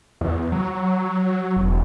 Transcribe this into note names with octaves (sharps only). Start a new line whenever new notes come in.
E2
F#3
E1